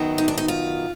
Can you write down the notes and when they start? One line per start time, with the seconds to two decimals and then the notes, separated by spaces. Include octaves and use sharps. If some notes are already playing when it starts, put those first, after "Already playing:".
Already playing: F#2 D#3 F#3 B3
0.18 D#4
0.28 D4
0.38 D#4
0.48 F4